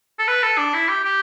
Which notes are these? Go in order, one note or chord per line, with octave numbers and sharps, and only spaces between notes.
A4
B4
A4
D4
E4
G4
G4